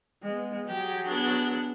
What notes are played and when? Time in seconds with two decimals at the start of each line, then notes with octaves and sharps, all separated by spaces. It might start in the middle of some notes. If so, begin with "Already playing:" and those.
0.22 G#3 B3
0.68 F#3 G4 G#4
1.08 B3 D4